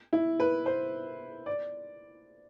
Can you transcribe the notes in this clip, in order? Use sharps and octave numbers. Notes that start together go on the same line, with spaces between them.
E4
B4
C5
D5